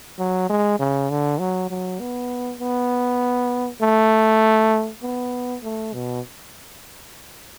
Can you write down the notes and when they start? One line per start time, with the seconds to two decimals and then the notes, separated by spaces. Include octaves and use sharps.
0.19 F#3
0.49 G#3
0.80 C#3
1.10 D3
1.40 F#3
1.70 F#3
2.00 B3
2.61 B3
3.82 A3
5.02 B3
5.63 A3
5.93 B2